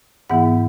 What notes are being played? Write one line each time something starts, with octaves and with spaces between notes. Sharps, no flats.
G#2 E3 B3 E4 F#5